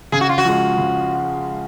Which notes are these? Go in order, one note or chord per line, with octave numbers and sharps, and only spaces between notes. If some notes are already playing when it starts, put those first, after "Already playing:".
C#3 G#4
F#4
F4
F#4
F3 G#3
C#3